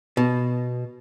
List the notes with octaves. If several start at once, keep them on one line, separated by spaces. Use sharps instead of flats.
B2